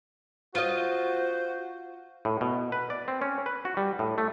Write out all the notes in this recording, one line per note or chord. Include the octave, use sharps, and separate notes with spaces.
F4 F#4 C5 D#5
A2
B2
B4
D5
C4
C#4
B4
F#4
G3
A2
A3